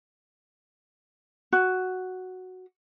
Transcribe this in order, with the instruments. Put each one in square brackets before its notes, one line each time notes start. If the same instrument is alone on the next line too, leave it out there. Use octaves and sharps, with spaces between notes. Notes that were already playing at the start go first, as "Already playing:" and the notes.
[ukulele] F#4